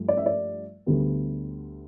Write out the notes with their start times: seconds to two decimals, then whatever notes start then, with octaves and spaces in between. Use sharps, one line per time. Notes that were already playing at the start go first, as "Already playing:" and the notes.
Already playing: G2 F3 A3
0.08 D5
0.17 E5
0.26 D5
0.86 D2 D3 G3 B3